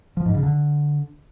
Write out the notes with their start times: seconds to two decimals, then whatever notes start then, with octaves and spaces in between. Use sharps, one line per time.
0.17 F3
0.26 G#2
0.34 C#3
0.43 D3